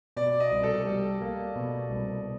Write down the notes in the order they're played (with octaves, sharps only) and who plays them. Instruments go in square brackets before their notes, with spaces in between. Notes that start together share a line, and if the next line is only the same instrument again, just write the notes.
[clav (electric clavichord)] B2 [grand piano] D5
[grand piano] D#5
[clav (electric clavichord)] C2
[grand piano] A4
[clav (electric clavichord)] G3 [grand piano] A4
[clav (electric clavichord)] A#3
B2
C2